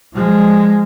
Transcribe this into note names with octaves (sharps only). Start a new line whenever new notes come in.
F3 G#3